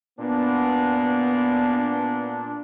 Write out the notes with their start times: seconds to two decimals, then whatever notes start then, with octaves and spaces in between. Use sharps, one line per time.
0.19 A#2 B3 D4